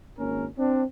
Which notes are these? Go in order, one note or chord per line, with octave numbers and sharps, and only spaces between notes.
G#1 A#3 C#4 A#4
C4 D4